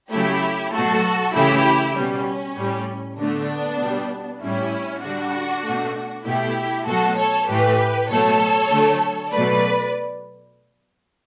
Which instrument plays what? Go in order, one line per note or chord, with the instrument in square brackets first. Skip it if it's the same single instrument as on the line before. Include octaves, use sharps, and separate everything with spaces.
[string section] C#3 F#3 A3 E4 G4
B2 F#3 A3 F#4 A4
C#3 E3 A3 E4 G4
B2 G3 C#4
A2 G3
D3 A3 B3 D4
B2 G3
A2 G3 C#4 E4
D3 G3 D4 F#4
B2 A3
B2 A3 E4 G4
B2 F#3 A3 F#4 A4
A4 C#5
A2 E3 A3 G4 B4
B2 F#3 A3 A4 C#5
D3 F#3 A3
B2 F#3 A3 B4 D5